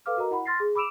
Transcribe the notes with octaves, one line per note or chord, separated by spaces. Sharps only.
A4 B4 F5 D6 F6
F#4 A#4 D#5 A#5
E4 F#5 B5
C6 F6 A6 A#6 C7
G#4
B5 D6 E6 D7 E7 F7